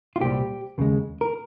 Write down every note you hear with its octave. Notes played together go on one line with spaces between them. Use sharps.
F4
C2 A#2 G3 G4
D#2 C#3 G#3
A#4